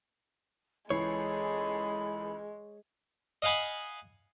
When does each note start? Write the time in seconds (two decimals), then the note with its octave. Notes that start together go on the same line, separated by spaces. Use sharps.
0.90 C#2 E3 G#3 G#4 A4 C#5 B5 C7
3.42 D#5 F5 F#5 G#5 B5